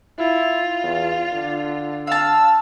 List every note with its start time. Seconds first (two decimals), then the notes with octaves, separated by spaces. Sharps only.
0.19 E4 F4
0.83 E2
1.34 D3
2.07 F5 A5 E6